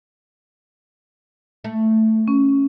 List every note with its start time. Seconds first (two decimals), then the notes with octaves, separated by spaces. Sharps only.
1.64 A3
2.28 C#4